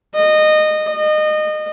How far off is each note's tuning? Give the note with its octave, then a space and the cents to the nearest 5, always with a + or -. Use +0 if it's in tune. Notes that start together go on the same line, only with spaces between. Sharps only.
D#5 -20
D#5 -25